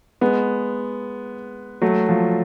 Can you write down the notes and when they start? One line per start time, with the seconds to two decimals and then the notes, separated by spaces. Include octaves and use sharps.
0.21 G#3 B3
1.82 F#3 A3
2.09 F3